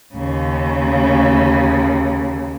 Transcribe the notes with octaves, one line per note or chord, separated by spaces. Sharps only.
D#2 C#3